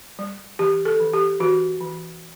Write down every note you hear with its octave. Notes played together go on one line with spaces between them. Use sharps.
G3
E3 G4
A4
E3
G4
E3 F#4
E3